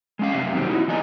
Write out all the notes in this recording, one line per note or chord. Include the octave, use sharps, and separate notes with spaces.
G#3 C#4 F5
F#2 C3 G4 E5 F5
B2 D#3 F#3 G3 B3 C4
D#4 E4 F#4
E3 B3 D5 D#5 G#5 A#5